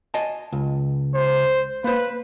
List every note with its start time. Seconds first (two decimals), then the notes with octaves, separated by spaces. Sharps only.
0.14 D#5 G#5 A5
0.52 C#2
1.15 C5
1.84 A#3 B4 C5